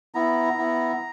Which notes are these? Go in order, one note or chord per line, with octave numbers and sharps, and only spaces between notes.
B3 E4 A#5
B3 E4